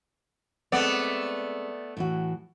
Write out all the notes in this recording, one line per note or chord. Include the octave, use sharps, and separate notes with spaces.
G#3 A3 B3 C4 D5
A2 E3 F#4